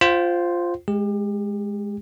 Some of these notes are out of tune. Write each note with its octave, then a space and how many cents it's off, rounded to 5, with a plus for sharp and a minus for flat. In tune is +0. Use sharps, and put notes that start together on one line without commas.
F4 +0 C5 +0 G5 -45
G#3 +0 G4 +35